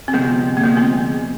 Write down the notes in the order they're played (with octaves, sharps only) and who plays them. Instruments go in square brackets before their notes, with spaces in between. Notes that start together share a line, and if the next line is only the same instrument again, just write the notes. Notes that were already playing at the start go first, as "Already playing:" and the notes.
[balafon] C4
[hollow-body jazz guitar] D2 C3 F3 G#3 [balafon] B3
[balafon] A#3
[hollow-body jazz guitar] D2 C3 F3 G#3 [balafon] B3
[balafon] C4